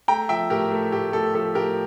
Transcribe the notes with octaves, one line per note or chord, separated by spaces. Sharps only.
A3 G5 A#5
F3 E5 G5
A2 G4 A#4
A3
A2 G4
A2 A4
F3 A4
A2 G4 A#4